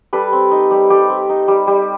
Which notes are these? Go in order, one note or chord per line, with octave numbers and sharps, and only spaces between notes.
G3 A4 B4
C4
D#4
G3
G3 G4 A4
C4
D#4
G3
G3